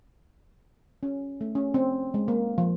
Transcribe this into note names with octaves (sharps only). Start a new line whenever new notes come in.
C#4
A3
C#4
C4
G#3
A#3
F3